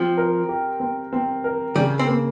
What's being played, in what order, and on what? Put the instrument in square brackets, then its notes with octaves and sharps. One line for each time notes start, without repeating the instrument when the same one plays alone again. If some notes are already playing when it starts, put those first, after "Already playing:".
Already playing: [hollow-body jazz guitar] F3 [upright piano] C4
[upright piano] A#4
G4
C4
C4
A#4
[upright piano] C#3 [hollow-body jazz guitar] G3
[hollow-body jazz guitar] C4
[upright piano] A#3